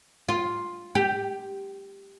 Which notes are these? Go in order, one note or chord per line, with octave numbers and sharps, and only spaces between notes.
F4
G4